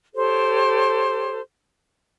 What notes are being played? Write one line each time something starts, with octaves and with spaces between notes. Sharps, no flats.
G4 A4 C5 C#5